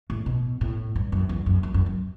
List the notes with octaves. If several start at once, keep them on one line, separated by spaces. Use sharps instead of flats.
A2
B2
A2
G2
F#2
E2
F#2
F#2
F#2
F#2